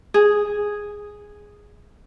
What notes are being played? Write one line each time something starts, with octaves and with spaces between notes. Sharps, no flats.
G#4